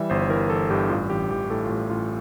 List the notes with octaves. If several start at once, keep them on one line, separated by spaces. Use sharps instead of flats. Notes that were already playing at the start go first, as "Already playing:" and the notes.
Already playing: E3 G3 E5
G1 C5
E3 A#4
E3 A4
G2 G4
A1 F4
A1 G4
A1 G4
A2 A4
F4
A1 G4
A1 F4